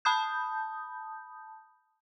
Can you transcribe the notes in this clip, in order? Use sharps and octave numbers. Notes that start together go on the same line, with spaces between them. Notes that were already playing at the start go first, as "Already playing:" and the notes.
A5 B5 D#6 G6